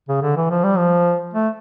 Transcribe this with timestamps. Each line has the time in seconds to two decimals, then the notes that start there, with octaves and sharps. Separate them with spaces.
0.09 C#3
0.22 D3
0.37 E3
0.50 F3
0.64 G3
0.78 F3
1.34 A3